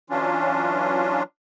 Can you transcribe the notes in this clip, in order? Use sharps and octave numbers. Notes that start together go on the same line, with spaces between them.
E3 F#3 C#4 D4 F4